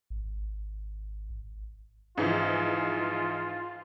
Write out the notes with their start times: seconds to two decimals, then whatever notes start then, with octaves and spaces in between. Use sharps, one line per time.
0.10 G#1
2.18 G#2 E3 F3 F4